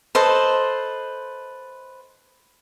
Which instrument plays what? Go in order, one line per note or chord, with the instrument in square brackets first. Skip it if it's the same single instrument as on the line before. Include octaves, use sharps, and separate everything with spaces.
[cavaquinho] A4 B4 C5 D#5